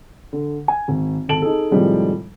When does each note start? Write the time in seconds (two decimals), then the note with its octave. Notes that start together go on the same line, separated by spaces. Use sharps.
0.33 D3
0.68 G#5
0.88 G#1
1.29 G#1 A4 A5 D7 F#7
1.42 D#4 G#4 A4
1.71 A2 C3 D#3 F3 G3 G#3